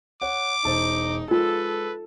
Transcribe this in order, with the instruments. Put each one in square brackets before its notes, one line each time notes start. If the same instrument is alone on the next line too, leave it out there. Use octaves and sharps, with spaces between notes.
[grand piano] C#5 F#5 [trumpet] D6
[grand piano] E1 C5 [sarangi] D#4 [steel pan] A5
[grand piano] G#3 [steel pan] F4 [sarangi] A4 [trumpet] B4